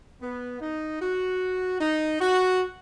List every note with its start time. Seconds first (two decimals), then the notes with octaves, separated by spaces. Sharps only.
0.21 B3
0.60 D#4
1.01 F#4
1.80 D#4
2.20 F#4